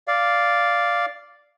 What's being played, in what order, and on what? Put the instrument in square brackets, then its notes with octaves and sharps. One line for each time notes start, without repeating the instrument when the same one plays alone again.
[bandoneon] D5 F5